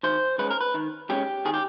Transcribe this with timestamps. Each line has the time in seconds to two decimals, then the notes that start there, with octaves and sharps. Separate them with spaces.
0.03 D#3 C5
0.39 G#3 C#4 B4
0.51 A#4
0.61 B4
0.74 D#3
1.10 G#3 C#4 G4
1.45 D#3 G#4
1.54 G4